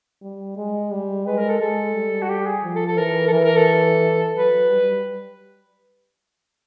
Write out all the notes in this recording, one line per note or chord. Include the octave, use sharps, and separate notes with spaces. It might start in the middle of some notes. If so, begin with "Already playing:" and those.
G3
G#3
G3
G#3 B4
A#4
A4
G#3 A4
G3
F#4
G4
G#4
F3
A4
A4
E3 A#4
A4
E3 A#4
A#4
A4
F#3 B4
G3